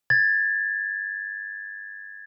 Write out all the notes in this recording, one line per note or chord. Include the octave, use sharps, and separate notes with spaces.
G#6 A6